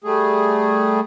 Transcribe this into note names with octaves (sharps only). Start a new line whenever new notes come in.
G3 A3 G#4